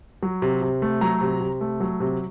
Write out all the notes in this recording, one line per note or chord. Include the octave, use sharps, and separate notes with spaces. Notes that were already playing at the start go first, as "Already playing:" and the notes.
F#3
C3
C3
A3
F#3 A#5
C3
C3
A3
F#3
C3